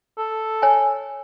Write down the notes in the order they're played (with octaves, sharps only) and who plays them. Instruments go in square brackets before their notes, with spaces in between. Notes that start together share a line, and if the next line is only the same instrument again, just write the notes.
[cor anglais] A4
[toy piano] C#5 G#5